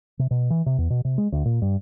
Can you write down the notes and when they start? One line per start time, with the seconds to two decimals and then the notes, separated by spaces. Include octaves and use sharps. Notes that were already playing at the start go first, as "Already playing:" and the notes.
0.19 C3
0.31 B2
0.50 E3
0.66 C3
0.78 E2
0.90 B2
1.05 C3
1.18 G#3
1.32 D2
1.45 A#2
1.62 G2